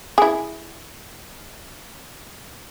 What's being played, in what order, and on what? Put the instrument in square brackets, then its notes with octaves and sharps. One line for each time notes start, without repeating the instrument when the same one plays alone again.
[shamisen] E4 G#4